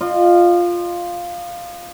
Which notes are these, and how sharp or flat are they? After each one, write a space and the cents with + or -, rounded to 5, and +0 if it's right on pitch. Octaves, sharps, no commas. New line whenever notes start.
F4 +0 D#5 -35